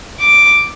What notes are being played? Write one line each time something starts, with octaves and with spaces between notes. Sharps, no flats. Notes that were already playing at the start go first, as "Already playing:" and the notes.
D6